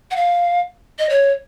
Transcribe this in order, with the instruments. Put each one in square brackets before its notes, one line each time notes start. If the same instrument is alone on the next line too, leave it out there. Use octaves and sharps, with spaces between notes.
[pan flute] F#5
F5
D#5
C#5